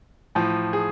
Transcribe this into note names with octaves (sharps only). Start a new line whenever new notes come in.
A2 F3
G#4